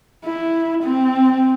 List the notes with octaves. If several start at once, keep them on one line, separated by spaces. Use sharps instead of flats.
E4
C4